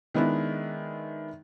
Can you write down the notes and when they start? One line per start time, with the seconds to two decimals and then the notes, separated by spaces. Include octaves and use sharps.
0.14 D#3 G#3 B3 D4 E4